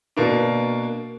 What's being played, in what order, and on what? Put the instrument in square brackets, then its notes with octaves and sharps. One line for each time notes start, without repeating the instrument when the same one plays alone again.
[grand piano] B2 A#3 D4